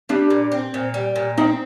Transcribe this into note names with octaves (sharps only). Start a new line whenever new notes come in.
G3 D4
A#2
C4
A#2
G3
A#2
C4 D#4